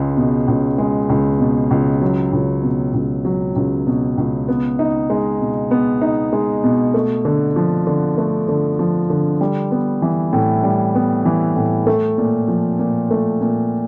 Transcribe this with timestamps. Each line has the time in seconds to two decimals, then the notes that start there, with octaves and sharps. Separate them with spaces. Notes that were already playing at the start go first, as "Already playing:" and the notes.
Already playing: C#2 G#3
0.17 B2
0.48 C#2
0.78 G#3
1.09 C#2
1.40 B2
1.71 C#2
2.02 F#3
2.33 C#2
2.63 B2
2.94 C#2
3.25 F#3
3.56 C#2
3.87 B2
4.18 C#2
4.48 B3
4.79 D#4
5.10 G#3
5.41 B2
5.71 B3
6.01 D#4
6.33 G#3
6.64 B2
6.94 A3
7.25 D3
7.56 F3
7.87 D3
8.18 A3
8.49 D3
8.79 F3
9.10 D3
9.41 G3
9.71 B3
10.02 E3
10.33 A2
10.64 G3
10.95 B3
11.25 E3
11.56 A2
11.87 A3
12.18 A#2
12.48 F3
12.79 A#2
13.11 A3
13.41 A#2